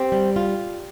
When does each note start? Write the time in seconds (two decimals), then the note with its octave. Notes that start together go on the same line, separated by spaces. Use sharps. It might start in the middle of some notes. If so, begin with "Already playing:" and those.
Already playing: C4 G4
0.12 G3
0.36 F4